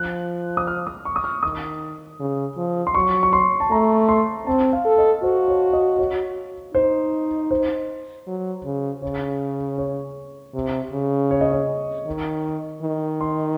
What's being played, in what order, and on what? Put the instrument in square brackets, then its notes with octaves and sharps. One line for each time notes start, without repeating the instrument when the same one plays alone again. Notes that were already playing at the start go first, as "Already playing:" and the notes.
Already playing: [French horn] F3 [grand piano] F#6
[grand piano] D#6
F6
D#6
C#6
D#6
F6
[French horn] D#3 [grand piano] D#6
[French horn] C#3
F3
[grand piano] C6
[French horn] F#3 [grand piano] C#6
[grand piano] C#6
C6
A5
[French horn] A3 [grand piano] A#5
[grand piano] C6
[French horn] C4 [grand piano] A5
[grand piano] F5
[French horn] A4
[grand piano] D#5
[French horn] F#4 [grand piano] C5
[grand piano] C#5
D#5
C#5
[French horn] D#4 [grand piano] C5
[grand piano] C5
[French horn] F#3
C#3
[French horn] C#3 [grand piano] C#5
[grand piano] C#5
[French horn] C3
C#3
[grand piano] C#5
D#5
C#5
[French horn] D#3
D#3
[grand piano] C6